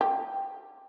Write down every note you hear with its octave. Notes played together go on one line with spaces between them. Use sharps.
G4